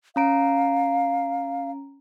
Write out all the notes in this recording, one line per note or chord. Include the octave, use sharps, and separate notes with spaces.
C#4 F5 A#5 D7